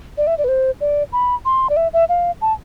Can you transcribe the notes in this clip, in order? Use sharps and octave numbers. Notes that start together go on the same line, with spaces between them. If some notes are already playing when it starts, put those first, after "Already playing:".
D5
E5
D5
B4
C5
D5
B5
C6
D5
E5
E5
F5
A5